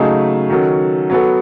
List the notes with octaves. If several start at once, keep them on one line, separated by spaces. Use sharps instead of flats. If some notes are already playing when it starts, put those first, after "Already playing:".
Already playing: C#3 F#3 A3 D#4 G#4
D#3 F#3 C#4 F#4 A4
F#3 B3 F#4 A4